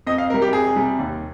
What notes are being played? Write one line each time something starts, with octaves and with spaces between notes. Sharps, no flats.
F2 D#5
F5
C3 G3 A#4
G4
F2 G#4
C3 G3
D#2